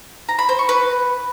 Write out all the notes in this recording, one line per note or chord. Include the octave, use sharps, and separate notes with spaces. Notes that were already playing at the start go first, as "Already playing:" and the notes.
A#5
B5
C5
C#6
B4